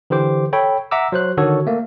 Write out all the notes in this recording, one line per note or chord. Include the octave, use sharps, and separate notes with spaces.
D3 E3 G4 C5 D6
A4 C#5 G5 B5
E5 F#5 A#5 D6 E6
F#3 C5 F#6
D3 D#3 F#4 A4 C#5
A3 A#3